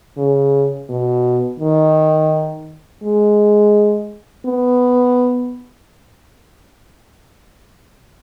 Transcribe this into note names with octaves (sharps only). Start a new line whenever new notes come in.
C#3
B2
D#3
G#3
B3